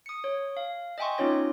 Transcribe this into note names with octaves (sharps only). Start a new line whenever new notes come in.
D#6 C#7
C#5
F5
D#5 E5 G5 G#5 C6 C#6
B3 C#4 D#4 F4 C#5 A#6